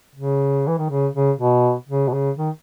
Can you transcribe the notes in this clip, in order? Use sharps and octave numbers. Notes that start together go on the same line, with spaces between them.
C#3
E3
D#3
C#3
C#3
B2
C#3
B2
C#3
D#3